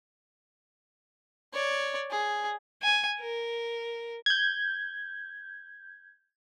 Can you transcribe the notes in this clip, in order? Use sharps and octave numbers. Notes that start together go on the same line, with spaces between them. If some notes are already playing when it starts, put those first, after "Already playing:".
C#5 D5
G#4
G#5
A#4
G6 G#6